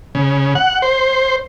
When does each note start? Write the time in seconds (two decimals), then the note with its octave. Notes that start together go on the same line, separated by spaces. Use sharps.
0.15 C#3
0.55 F#5
0.82 C5